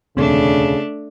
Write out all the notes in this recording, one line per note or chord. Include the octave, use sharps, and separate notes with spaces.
E1 D2 C#3 A3 C4 D4